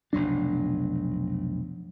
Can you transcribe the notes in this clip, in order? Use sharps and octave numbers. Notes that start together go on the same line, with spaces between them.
F1 B1 F#3 D4